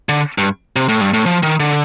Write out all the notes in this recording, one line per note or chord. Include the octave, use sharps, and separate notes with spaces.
D3
G2
C3
A2
G2
A2
F3
D#3
D3